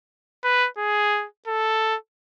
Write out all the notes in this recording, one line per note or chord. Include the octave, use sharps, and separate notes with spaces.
B4
G#4
A4